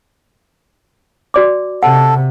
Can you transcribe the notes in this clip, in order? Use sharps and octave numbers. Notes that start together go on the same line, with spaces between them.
F#4 D5 D6
C3 A4 F#5